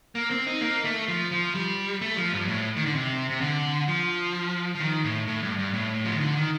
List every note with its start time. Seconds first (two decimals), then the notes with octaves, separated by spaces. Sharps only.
0.15 A#3
0.30 C4
0.46 D#4
0.61 A#3
0.85 A3
1.08 F3
1.31 F3
1.55 G3
2.01 A3
2.17 F3
2.33 G2
2.48 A2
2.76 D#3
2.86 D3
2.94 C3
3.30 C3
3.41 D3
3.88 F3
4.75 F3
4.80 D#3
5.04 A2
5.27 A2
5.43 G2
5.59 G2
5.74 A2
6.05 F3
6.13 D#3
6.20 D3
6.36 D#3